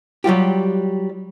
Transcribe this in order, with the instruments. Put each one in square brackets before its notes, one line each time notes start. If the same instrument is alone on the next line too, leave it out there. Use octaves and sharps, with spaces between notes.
[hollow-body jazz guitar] F#3 G3 F4 G4